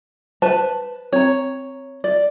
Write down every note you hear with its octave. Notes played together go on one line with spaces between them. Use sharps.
B4 C5 A5
C4 C#5 A#5
D5